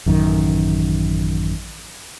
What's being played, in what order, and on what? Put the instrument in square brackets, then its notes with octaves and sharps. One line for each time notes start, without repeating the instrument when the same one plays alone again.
[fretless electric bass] A1 F#2 D#3